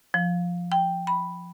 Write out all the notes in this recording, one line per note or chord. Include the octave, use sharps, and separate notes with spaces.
F3
G5
B5